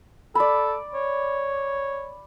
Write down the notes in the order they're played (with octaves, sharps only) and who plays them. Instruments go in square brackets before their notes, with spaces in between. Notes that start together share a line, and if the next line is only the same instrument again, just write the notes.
[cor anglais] A4 [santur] D5 B5
[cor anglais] C#5